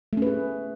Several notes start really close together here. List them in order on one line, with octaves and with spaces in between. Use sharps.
A3 C#4 B4 G#4